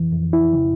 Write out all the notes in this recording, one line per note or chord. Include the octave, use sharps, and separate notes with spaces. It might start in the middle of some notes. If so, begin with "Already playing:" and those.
Already playing: F2 E3
F2
E4
C#3